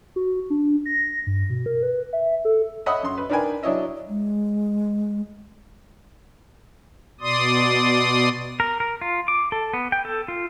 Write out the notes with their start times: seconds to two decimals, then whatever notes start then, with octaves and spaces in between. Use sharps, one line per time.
0.16 F#4
0.50 D4
0.86 A#6
1.27 G2
1.50 B2
1.66 A#4
1.83 B4
2.13 E5
2.45 A4
2.86 C#5 D#5 E5 F#5 B5 D#6
3.03 F#2 C6
3.18 B4
3.30 D4 D#4 A#4 B4 G5 G#5
3.63 F#3 D4 E4 C#5 D#5 E5
4.08 G#3
7.21 B2 D5 C6 D#6
8.60 A#4
8.80 A#4
9.01 F4
9.28 D6
9.52 A4
9.74 B3
9.92 G5
10.05 A4
10.28 F4